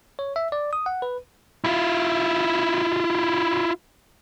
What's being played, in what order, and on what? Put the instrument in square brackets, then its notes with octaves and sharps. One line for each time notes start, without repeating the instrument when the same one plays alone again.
[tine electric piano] C#5
E5
D5
D#6
F#5
B4
[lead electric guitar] E4 F4